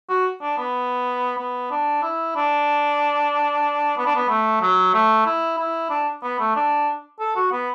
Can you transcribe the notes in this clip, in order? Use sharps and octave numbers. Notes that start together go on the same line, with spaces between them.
F#4
D4
B3
B3
D4
E4
D4
B3
D4
B3
A3
F#3
A3
E4
E4
D4
B3
A3
D4
A4
F#4
B3